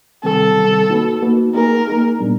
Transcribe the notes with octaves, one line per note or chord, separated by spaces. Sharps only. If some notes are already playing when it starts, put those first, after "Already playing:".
C3 D#3 G3 C4 A4
C3 D#3 G3 C4
A#3 D#4 F#4 B4
A#3 D#4 F#4 B4
A#3 D#4 G#4 A#4
A#3 D#4 G#4
A#2 G3 B3 D4